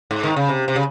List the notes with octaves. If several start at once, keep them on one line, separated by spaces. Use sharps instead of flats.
G#2
D#3
C#3
C3
C3
C#3